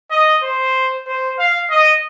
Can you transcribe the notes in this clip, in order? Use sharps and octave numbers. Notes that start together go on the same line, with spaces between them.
D#5
C5
C5
F5
D#5